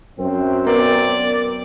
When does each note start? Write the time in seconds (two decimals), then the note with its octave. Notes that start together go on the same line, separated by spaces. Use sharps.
0.19 F#2 C4
0.67 B3 A#4 D5